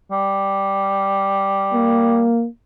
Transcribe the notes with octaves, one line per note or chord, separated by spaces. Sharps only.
G3
A#3